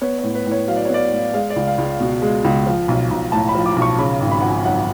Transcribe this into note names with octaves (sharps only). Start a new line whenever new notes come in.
B3 C#5
A2 C#5
B4
A2
C#5
F#3 F5
D5
C#5
B3 D5
A2
G#3 F5
D5
C#2
F5
C#2
B2
G#3
C#2
F3
B1
B1
A2 A5
B5
F3
D6
B1
C#6
C#3 B5
G#1
B5
F3 F#5
G#5
F#2 F#5